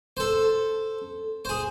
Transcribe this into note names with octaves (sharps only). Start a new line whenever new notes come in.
A4 C5
G#4 C5